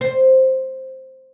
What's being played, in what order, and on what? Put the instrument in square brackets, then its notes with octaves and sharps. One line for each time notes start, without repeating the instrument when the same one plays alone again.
[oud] C5